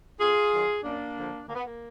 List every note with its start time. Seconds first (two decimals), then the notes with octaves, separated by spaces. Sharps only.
0.20 F2 F4 G#4
0.53 D#3 F#3
0.84 F#2 A#3 D4
1.17 D3 F3
1.48 D2 A#3
1.55 B3
1.63 A#3